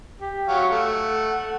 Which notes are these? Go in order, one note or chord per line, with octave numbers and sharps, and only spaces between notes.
G4
F#3 F5 F#5
A3